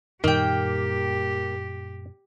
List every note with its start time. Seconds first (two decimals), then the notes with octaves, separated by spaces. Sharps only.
0.24 F#2 A#2 D#3 G3 A#3 G4 G5